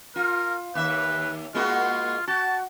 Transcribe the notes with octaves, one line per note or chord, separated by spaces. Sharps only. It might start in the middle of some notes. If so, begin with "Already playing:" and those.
F4 A#4
D#2 B4 E5
G#3 A#3 F4 F#4
F#4 A5